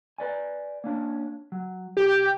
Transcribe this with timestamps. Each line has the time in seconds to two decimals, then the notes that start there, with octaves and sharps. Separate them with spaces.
0.18 B4 D5 G#5
0.84 A#3 C#4 D4
1.52 F#3
1.97 B1 G4